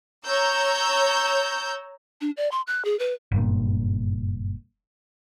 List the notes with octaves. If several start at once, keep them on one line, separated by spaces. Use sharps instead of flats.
C#5 A#5 E6 G6
D4
D5
C6
F#6
G#4
B4
F#1 G2 A#2